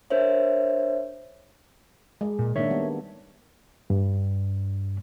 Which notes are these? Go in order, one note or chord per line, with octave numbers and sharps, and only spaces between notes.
D4 A#4 C5 C#5 E5
G#3
A#2
D#3 A#3 D4 C#5 E5
G3 B3
G2